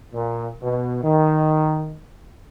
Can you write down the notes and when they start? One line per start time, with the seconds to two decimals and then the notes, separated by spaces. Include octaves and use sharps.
0.14 A#2
0.62 B2
1.04 D#3